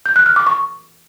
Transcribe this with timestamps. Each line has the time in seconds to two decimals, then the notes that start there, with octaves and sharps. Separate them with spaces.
0.06 G6
0.16 F#6
0.26 F6
0.36 D6
0.47 C#6